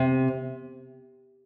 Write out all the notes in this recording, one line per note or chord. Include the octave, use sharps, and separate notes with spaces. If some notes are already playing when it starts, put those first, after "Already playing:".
Already playing: C3